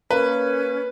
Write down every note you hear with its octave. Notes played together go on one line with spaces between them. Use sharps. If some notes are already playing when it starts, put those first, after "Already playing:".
A#3 C#4 B4